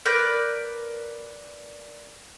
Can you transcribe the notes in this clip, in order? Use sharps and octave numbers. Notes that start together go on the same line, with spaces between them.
A#4 B4 D5 G6